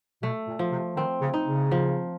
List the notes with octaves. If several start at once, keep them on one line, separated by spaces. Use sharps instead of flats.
B2 A3
A#2
F3
C3
D#3 C4
C#3
D#4
C#3
F3